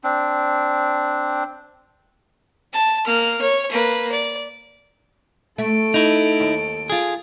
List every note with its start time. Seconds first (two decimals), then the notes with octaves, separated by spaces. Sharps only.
0.04 C4 D4
2.73 A5
3.06 A#3 F6
3.42 C#5
3.72 A#3 B4
4.12 D5
5.58 A3 A4 D7
5.94 D#4 E4
6.40 D#2
6.90 F4 G#4